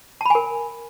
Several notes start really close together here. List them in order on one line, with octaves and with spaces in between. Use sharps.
A5 B5 G#5 A#4